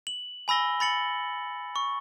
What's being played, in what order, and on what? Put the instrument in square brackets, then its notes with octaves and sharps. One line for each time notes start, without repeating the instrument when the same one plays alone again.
[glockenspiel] F#7
G#5 B5 E6 A#6 G7
B5 A6 C#7 F#7
C#6